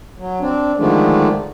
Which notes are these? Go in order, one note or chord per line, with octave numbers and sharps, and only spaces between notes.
F#3
C4 D4
D3 D#3 F3 G#3 A3 D4